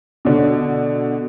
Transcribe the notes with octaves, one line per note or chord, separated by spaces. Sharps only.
B2 D3